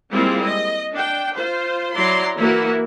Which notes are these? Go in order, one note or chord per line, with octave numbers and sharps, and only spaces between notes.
G3 G#3 A#3 C4 E4 F4
D#5
D4 G5
F4 C5
F#3 E4 D5 A#5 C6
E3 A#3 E4 F#4 A#4